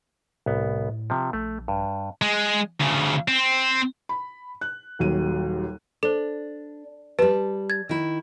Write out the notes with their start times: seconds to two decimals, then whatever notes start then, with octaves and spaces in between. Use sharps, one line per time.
0.46 C2 A2 B3
1.10 C3 F3
1.33 A#1 A3
1.68 G2
2.22 G#3
2.80 D2 C#3
3.28 C4
4.09 B5
4.61 F#6
4.99 D#1 D#2 F#3 D#7
6.03 D4 A4 C5
7.19 G3 G4 B4 A5
7.70 G#6 A6
7.89 D#3 E4